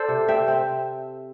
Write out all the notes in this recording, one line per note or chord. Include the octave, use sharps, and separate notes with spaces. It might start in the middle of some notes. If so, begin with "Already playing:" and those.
Already playing: A4 C5 D5
C3
C3 E5 G5
C4